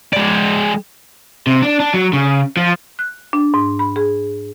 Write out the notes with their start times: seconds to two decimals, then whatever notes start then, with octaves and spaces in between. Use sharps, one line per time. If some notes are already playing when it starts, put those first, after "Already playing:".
0.13 G#3 D5
1.47 C3
1.62 D4
1.80 D4
1.94 F#3
2.13 C#3
2.57 F3
2.99 F#6
3.33 D4
3.54 G#2
3.79 B5
3.96 G#4